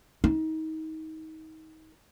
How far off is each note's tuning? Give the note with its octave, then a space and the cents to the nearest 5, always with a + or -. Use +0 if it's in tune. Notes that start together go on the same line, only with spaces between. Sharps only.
D#4 +30